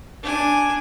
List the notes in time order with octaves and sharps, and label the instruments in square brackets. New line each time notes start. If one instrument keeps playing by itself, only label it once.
[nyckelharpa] D4 G#5